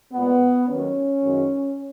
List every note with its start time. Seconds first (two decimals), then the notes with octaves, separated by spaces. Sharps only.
0.13 A#2 G#3 B3
0.67 D#2 D#3 F#3 C#4
1.21 F#2 D#3 G#3